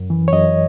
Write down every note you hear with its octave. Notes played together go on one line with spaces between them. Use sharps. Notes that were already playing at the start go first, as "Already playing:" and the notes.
Already playing: F#2
E3
C#5
F#2 D#5